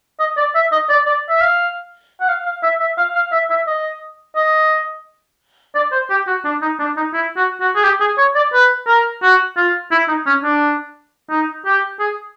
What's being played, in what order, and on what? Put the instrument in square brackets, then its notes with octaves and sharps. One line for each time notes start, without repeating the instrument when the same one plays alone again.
[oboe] D#5
D5
E5
D#5
D5
D5
E5
F5
F#5
F5
F5
E5
E5
F5
F5
E5
E5
D#5
D#5
D5
C5
G4
F#4
D4
D#4
D4
D#4
E4
F#4
F#4
G#4
G4
G#4
C#5
D5
B4
A#4
F#4
F4
E4
D#4
C#4
D4
D#4
G4
G#4